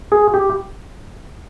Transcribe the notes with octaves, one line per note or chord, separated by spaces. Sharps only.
G#4
G4